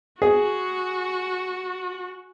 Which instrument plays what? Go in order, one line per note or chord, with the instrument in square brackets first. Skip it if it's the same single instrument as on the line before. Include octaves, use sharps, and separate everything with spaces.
[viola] F#4 [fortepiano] G#4